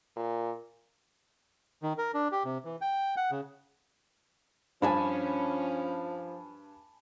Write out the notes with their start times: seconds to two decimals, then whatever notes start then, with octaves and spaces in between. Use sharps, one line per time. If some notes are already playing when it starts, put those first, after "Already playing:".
0.16 A#2
1.83 D#3
1.98 A#4
2.14 D4
2.32 G4
2.45 C3
2.65 E3
2.81 G5
3.17 F#5
3.31 C#3
4.82 G2 F3 C#4 G#5 A5 B5